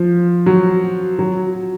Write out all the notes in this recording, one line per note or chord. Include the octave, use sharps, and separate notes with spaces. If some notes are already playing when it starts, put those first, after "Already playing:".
Already playing: F3
F#3
F#3